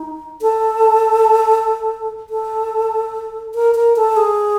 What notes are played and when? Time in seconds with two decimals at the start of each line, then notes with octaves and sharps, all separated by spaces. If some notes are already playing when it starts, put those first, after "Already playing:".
Already playing: D#4
0.42 A4
2.30 A4
3.55 A#4
3.75 A#4
3.96 A4
4.17 G#4